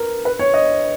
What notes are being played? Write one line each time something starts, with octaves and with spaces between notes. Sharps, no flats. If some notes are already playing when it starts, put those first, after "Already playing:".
Already playing: A#4 B4
B4
C#5
D#5